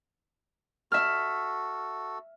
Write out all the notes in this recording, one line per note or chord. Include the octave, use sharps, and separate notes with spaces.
F#4 A4 E5 F6